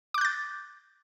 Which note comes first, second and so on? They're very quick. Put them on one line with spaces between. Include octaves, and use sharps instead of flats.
D6 F#6 G6 A6